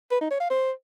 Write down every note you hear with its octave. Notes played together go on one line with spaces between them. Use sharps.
B4
D#4
C#5
F5
C5